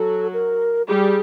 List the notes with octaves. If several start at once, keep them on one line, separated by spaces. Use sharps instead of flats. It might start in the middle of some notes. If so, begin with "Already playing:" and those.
Already playing: F#3 F#4 A4
A#4
G3 G4 G#4